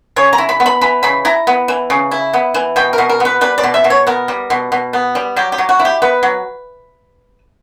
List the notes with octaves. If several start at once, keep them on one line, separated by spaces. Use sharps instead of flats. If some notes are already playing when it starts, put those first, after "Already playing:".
C#3 C#5
A#5
E4
B5
B3
B5
E3 B5
C#3 B5
E4 A#5
B3
E3
C#3
E4
B3
E3
B2 G5
A#4
B2
A#4
B3 B4
G3 B4
D5
B2
E5
B2
C#5
B3 A#4
G3
B2
B2
B3
G3
F#3 G4
G4
F#3
F#4
E4
G4
B3 B4
F#3